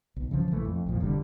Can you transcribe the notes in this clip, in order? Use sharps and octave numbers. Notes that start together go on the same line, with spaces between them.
B1
C#3 E3 F3
A#1 E3 A3
F2
B1 E2 A#2 F3
F1 D3 G3